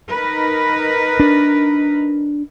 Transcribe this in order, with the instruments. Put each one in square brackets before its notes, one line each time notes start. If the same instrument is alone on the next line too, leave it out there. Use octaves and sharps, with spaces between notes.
[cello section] D#4 A#4 B4
[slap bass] D4